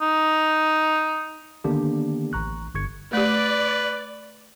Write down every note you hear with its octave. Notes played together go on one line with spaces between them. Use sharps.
D#4
D3 D#3 A#3 B3 D4 G4
A1 A#5 C#6 F#6
G1 C#6 G#6 C#7
A3 G4 B4 D5